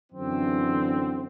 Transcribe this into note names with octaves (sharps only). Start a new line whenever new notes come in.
F#2 D3 E3 C4